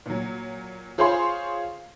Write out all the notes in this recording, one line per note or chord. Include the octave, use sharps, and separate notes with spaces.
A#2 F#3
F4 G#4 C5 C#5 F5 C6